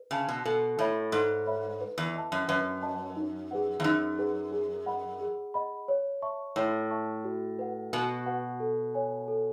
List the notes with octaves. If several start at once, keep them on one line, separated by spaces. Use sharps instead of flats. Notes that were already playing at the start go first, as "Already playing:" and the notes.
Already playing: B4
C#3 E5 A5
B2
B2 A4
A2 C#5 E5 B5
G#2 A4
C#5 E5 B5
B4
E2
D#5 A5
F#2
F#2 B4
D#5 A5
D#4
G#4 B4 F#5
E2
F#2 D#4
G#4 B4 F#5
G#4
D#5 F#5 B5
G#4
D#5 F#5 B5
C#5
E5 A5 C#6
A2 C#5
E5 A5 C#6
F#4
B4 F#5
B2 F#4
B4 F#5
A4
C#5 G#5
A4